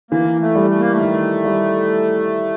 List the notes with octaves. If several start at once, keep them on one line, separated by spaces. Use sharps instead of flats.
E3 A#3
A3
G3
A3
A#3
A3
D#3
G3